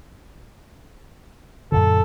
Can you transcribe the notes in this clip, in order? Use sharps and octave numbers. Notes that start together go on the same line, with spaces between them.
F#2 A#2 D3 A4